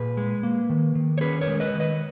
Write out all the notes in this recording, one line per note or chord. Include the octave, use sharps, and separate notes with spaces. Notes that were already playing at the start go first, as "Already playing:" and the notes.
Already playing: A#2 G#4 B4
G#3
A#3
D#3
D#3
C#5
C#4 G#4 B4
A#4 C#5
G#3
B4 D#5
D#3
B4 D#5